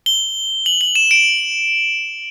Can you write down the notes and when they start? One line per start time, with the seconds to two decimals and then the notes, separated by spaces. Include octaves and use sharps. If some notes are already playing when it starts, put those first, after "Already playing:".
0.06 G7
0.66 F#7
0.81 F#7
0.95 E7
1.11 D7